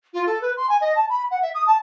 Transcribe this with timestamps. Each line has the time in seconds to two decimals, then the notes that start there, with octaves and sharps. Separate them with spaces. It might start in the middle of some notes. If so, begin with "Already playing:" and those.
0.14 F4
0.27 A4
0.42 B4
0.57 C6
0.69 G#5
0.81 D#5
0.96 A5
1.09 B5
1.31 F#5
1.42 E5
1.55 D#6
1.67 A5